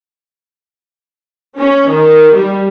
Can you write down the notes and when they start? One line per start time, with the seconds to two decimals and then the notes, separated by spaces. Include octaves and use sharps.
1.57 C#4
1.90 D#3
2.36 G3